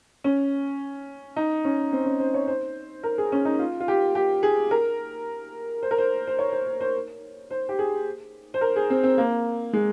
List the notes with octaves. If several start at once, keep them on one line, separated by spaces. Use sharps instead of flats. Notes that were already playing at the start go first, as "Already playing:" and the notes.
C#4
D#4
C#4
C4
C#4
C5
C#5
C5
A#4
G#4
C#4
D#4
F4
F4
G4
G4
G#4
A#4
C5
A#4
C5
C5
C#5
C5
C5
C5
C5
G4
G#4
C5
A#4
G#4
C4
C4
A#3
G#3